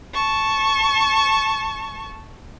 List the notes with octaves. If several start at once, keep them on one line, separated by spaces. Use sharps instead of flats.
A5 C#6